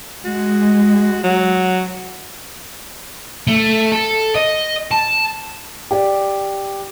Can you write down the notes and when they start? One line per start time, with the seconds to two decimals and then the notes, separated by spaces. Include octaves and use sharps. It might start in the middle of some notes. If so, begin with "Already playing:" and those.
0.25 G#3 F#4
1.23 F#3
3.47 A3
3.92 A4
4.36 D#5
4.91 A5
5.91 G4 D5